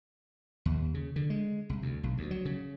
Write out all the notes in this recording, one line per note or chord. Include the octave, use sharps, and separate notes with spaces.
D#2
C#3
D3
G#3
C2
D2
B1
D2
F#3
C#3